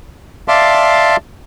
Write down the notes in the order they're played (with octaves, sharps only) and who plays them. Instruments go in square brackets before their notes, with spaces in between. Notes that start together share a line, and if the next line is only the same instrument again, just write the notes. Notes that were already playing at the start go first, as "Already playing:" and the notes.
[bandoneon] D5 E5 F5 A5 C6 D6